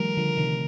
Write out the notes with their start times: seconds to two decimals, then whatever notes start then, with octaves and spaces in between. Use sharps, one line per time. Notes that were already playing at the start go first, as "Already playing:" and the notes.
Already playing: D#3 F3 G3 A3 A#4
0.17 D3 F3
0.37 C3 D#3